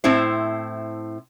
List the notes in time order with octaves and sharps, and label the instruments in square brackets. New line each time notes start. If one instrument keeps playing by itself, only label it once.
[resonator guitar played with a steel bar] A2 C4 E4 C5